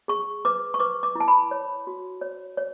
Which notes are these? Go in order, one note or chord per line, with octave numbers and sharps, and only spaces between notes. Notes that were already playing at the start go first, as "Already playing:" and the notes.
G#4 C#6
B4 D6
C#6
B4 D6
D6
E4
A5
B5
C#5
F#4
C#5
C#5